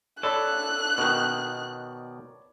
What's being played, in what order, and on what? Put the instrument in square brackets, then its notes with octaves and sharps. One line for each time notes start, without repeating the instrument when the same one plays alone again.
[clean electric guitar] A4 [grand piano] C#5 D5 B5 [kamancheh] F#6
[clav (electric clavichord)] B2 D#3